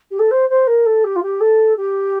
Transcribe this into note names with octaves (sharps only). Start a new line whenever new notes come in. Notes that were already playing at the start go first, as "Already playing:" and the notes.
G4
A4
C5
C5
A#4
A4
G4
F4
G4
A4
G4